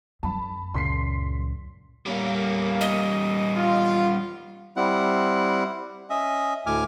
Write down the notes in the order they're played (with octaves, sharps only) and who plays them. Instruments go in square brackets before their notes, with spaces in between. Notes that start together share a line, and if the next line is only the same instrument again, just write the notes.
[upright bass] F#2 [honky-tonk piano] A5 B5
[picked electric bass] C#2 A#2 C#3 [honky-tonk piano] C6 B6 C7
[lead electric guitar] G3 C#4 [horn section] A#3
[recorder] D#5
[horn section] F4
[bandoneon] G3 C4 E4 F#5
C#4 D#5 E5
D2 A2 G#5 D6 F6